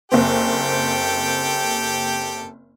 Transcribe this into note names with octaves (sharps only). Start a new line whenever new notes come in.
F#1 A#3 C4 G4 A4 G5